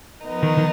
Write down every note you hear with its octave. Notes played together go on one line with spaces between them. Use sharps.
F3 B3 D#4 A#4
D#3
D#3